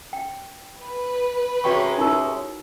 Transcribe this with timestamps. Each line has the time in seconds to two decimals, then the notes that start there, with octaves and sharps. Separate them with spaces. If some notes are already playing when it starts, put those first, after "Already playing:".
0.13 G5
0.78 B4
1.64 C3 G#3 C#4 F#4 G5 C#6
1.98 D#4 E4 A#4